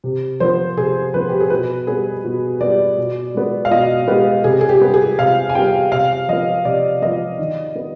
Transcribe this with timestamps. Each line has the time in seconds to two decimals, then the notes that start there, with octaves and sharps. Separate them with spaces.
0.04 C3
0.40 F3 B3 C5
0.77 C3 G#4
1.14 F3 B3 B4
1.29 G4
1.40 G#4
1.50 B2 B4
1.87 G3 B3 G#4
2.25 B2
2.61 G3 B3 D5
2.98 B2
3.34 G#3 B3
3.65 F5
3.71 B2 D#5
4.08 G#3 B3 G4
4.44 C3 G#4
4.61 G#4
4.69 G4
4.81 G3 B3
4.94 G#4
5.18 C3 F5
5.49 G#5
5.55 G3 B3 G5
5.92 C3 F5
6.28 F3 B3 D#5
6.65 C3 D5
7.02 F3 B3 D#5
7.39 D#3
7.75 B3